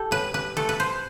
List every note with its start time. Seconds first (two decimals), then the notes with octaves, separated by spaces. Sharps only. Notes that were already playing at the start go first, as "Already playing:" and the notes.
Already playing: G4 A4
0.11 A2 B4
0.34 B4
0.57 A3 A4
0.69 B4
0.80 C5